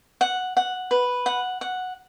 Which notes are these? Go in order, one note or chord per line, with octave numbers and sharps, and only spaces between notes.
F#5
F#5
B4
F#5
F#5